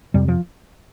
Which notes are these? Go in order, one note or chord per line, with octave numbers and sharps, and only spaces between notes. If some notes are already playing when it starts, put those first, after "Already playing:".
F2 C3 G3
F3